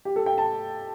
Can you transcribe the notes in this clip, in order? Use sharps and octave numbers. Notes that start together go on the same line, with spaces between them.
G4
A4
G5
A5